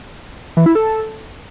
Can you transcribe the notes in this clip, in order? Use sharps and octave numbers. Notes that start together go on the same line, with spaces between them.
E3
E4
A4